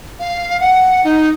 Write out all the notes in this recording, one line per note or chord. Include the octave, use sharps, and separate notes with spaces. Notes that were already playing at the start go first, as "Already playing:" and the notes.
F5
F#5
D#4